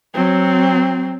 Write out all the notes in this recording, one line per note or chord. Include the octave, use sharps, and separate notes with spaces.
F#3 C4